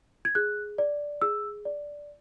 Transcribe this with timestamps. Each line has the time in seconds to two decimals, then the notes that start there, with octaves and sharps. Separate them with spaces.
0.25 G#6
0.35 G#4 F#6
0.78 D5
1.22 G#4 E6
1.65 D5